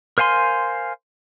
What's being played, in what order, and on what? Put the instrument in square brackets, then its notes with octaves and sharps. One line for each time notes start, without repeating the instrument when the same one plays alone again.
[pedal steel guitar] A#4 C5 F5 G#5 C6